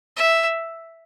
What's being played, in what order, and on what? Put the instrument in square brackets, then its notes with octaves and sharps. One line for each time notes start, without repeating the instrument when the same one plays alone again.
[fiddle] E5